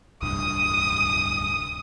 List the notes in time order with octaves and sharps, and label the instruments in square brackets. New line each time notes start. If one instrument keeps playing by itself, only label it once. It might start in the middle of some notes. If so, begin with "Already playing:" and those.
[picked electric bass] D1 C2 G2 [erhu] D#6